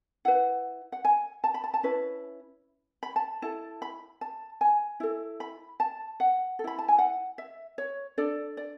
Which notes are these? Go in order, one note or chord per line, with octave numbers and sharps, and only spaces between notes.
E4 B4 F#5
F#5
G#5
A5
B5
A5
A5
C#4 E4 B4
B5
A5
E4 A4 A5
B5
A5
G#5
E4 A4
B5
A5
F#5
A4
E4 B5
A5
G#5
F#5
E5
C#5
D4 A4 D5
D5